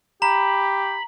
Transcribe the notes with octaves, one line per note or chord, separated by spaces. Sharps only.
G4 A#5 B5